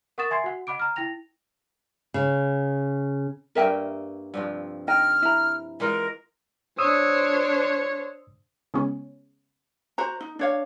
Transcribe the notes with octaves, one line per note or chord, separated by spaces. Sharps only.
A#4 F#5 C#6 D#6 A6 E7
E5 G#5 C6 G#6 C7
F#4 F#5
D#5 F#5 B5 D6 D7
A#5 F6
E4 G5 A#6 F7
C#3
G2 A#3 A#4 D#5 E5 G5
G2 C3 F3
D#4 D#5 G5 F6
E4 A#5
E3 G#3 F4 A#4
D4 C5 C#5 D#6 E6
C#3 G#3 B3 C#4
F#4 C5 A#5
D#4
D4 C#5 F5